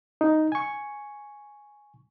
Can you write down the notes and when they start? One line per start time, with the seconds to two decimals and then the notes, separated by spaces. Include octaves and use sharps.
0.21 D#4
0.52 G#5 C#6